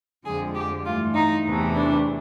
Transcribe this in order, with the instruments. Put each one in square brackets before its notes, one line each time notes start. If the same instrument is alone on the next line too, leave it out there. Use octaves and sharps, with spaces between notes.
[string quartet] F2 D3 F3 G#3 G#4
G4
G2 E3 A3 F4
D#4
E2 C3 E3 A3
D4